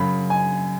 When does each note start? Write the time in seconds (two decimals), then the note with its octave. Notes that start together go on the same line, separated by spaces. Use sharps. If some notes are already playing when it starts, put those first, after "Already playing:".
Already playing: F#2 C#3 B5
0.30 G#5